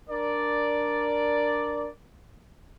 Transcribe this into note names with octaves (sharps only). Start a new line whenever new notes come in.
D4 A#4 D5